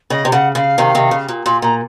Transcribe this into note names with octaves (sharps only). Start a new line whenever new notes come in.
C#3 D#5
C3
C#3 F#5
C#3 F5
C3 D#3
C3 D#3
C#3
A#2
A#2 C6
A#2 A#5